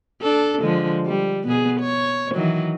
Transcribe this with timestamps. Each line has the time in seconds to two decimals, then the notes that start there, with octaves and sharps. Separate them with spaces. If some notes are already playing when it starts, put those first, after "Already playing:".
0.22 D4 A4
0.61 D3 F3 G#3
1.07 G3
1.46 B2 B3 G#4
1.80 C#5
2.35 D#3 E3 F#3